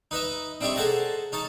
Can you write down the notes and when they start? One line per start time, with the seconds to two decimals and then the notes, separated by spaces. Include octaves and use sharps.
0.11 D#4 B4 D#5 E5
0.61 C4 D4 E4 G4 D#5 C#6
0.76 G#4 A4 C5 F#5 A5 A#5
1.32 C#4 D#4 A5